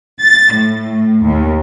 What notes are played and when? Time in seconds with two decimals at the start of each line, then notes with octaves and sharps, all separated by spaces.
0.21 A6
0.53 A2
1.23 D#2